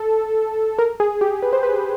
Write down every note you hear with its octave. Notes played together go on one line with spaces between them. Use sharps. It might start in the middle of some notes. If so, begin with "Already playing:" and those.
Already playing: A4
A#4
G#4
G4
B4
C5
B4